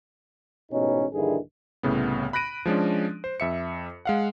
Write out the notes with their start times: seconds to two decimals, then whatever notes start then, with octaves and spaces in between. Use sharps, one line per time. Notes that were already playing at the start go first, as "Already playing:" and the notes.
0.72 A1 G#2 B2 C#4 D#4
1.13 A#1 G2 D3 D#3 E4 G#4
1.83 C2 A2 C#3 B3
2.33 B5 F#6 A#6 D7 D#7
2.66 F3 G#3 C#4 D4
3.24 C5
3.40 F2 E5 C#7
4.05 G#3 F5 F#5